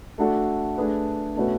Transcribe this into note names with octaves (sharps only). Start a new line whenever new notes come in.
A3 D4 F#4 A4
A3 D4 G#4 B4
B2 A3 C#4 F#4 B4